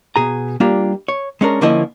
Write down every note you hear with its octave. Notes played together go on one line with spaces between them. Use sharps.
B2 G#4 A#5
G3 A#3 D4 F4
C#5
G#3 C#4 D4 A#4
D3 F3 A#3 C#4 E4 D#5